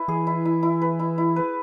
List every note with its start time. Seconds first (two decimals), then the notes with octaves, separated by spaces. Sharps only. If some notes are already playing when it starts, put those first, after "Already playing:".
Already playing: E4 B4
0.08 E3 G#4
0.27 E4
0.45 E4
0.63 E4
0.82 B4
0.99 E4
1.18 E4
1.36 B4